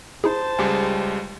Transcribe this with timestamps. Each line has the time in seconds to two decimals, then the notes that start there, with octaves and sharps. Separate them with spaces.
0.24 D#4 E4 G#4 C5 A5
0.58 C#2 G3 G#3 G#5 D6